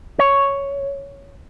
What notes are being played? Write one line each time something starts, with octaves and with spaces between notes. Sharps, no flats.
C#5